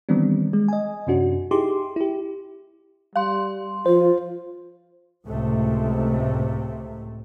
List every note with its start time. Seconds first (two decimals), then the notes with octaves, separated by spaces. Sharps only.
0.09 D#3 E3 G3 B3 C4 D4
0.53 G#3
0.68 D#5 G#5
1.07 F#2 C3 C#4 D4 F#4
1.51 D#4 E4 G4 G#4 C6 D6
1.96 E4 G4
3.16 G3 F5 C6
3.86 F3 F4 C5
5.25 C#2 A2 C3 A3